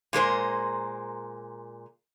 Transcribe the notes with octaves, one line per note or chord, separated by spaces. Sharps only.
A#2 G#3 A#4 C5